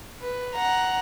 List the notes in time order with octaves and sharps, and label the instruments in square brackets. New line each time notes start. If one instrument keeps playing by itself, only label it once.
[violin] B4
F#5 A#5